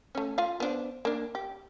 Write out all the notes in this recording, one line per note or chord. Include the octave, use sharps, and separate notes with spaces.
A3 C#4
F4 F5
B3 D4 C5
A#3 D4
G4